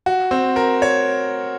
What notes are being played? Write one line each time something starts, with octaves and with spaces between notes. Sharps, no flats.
F#4
C4
A#4
C#5